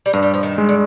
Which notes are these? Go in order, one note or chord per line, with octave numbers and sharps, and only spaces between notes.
G3
G2 F3
G3
F3
D#3
G#3
D3